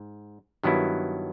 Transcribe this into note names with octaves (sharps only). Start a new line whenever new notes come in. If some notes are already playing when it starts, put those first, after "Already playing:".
Already playing: G#2
G2 D#3 F#3 B3 E4